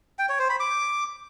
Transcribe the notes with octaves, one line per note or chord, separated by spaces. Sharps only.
G5
C#5
C5
B5
D6